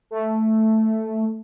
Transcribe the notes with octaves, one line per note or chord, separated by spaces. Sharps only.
A3